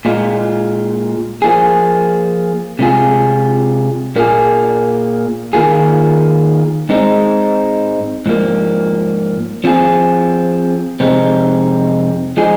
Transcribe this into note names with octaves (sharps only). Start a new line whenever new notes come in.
A#2 G#3 F4
F3 A#3 F4 G#4
C3 G#3 F4 G#4
A#2 A#3 F4 G#4
D#3 A#3 F4 G#4
G#2 G#3 C4 D#4
G#2 F3 A#3
F3 C4 F4 G#4
F2 C3 G#3 C4 D#4
F3 G#3 D#4 G#4